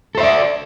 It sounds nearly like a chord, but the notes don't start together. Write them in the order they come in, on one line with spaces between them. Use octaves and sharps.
A4 C5 E5 D5